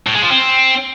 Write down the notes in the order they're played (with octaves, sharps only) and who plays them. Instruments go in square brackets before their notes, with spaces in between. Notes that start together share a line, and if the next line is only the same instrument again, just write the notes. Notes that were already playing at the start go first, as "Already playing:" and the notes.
[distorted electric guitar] A2
G#3
F3
C4